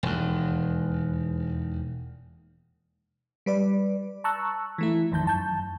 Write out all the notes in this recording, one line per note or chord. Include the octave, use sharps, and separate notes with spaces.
E1 D#2
G3 B4 D5
A5 A#5 C#6 E6 F#6
E3 A3 E4
A1 F2 D#3 A5 G6
F#2 A5 G6